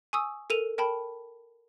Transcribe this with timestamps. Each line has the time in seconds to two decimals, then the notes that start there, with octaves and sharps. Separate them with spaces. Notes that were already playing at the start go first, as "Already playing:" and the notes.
0.13 G#5 C#6 D#6 E6
0.50 A4 A#4 D#7 F7
0.78 A#4 G5 A5 B5